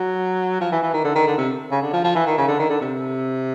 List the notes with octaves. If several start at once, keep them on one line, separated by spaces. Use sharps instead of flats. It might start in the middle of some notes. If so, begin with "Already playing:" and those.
Already playing: F#3
F3
E3
E3
D#3
D3
D#3
D3
C3
C#3
D3
F3
F3
E3
D#3
C#3
D3
D#3
D3
C3